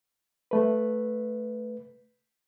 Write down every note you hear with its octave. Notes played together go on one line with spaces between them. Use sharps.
A3 B4